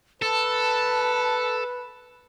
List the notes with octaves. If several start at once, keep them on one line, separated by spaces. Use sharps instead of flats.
A4 B4 A5